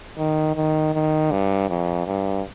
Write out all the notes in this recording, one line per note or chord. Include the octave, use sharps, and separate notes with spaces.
D#3
D#3
D#3
G2
F2
G2